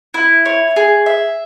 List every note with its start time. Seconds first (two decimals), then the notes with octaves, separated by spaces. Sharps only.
0.14 E4
0.45 C#5
0.76 G#4
1.06 E5